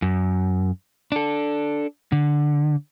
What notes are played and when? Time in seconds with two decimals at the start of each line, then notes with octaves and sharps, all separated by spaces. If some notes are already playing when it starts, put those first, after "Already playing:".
0.02 F#2
1.12 D4 A4
2.12 D3